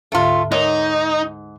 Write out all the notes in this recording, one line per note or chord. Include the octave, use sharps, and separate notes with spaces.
D2 G#2 D3 A3 F4
G#2 D#4 A#4 C#5